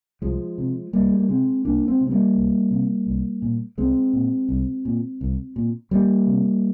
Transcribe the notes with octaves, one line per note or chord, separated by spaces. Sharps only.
C2 F3 G#3
C3
C2 G3 A#3
G#3
A#3
C3 G#3 C4
C2 A#3 D4
G#3 C4
C3
C4
G3 A#3
C2
C3
C2
A#2
C2 G#3 C4
A#2
C2
A#2
C2
A#2
F2 G3 A#3
C3